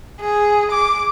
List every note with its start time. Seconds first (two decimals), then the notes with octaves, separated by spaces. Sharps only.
0.21 G#4
0.71 D6